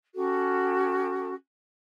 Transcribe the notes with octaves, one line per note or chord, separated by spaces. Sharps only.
C#4 F#4 G4 A4